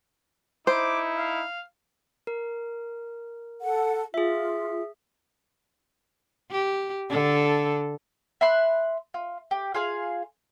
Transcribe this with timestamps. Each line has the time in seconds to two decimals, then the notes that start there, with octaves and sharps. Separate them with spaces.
0.67 D#4 E4 C5 D6
1.17 F5
2.27 A#4
3.61 A4 F#5
4.14 F4 G#4 E5
6.51 G4
7.10 D3 A4
8.41 E5 B5 C6 F#6
9.14 F4
9.51 G4
9.74 F4 G#4 F5